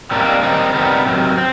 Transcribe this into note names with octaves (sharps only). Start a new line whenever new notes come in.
C3 D#3 G3 A#3 D4
D#3 G3 C4 D#4
C3 D#3 G3 B3 D#4
C3 D#3 F#3
C4